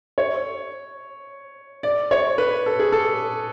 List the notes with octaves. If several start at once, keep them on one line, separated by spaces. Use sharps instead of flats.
C#5
D5
C#5
B4
A4
G#4
A4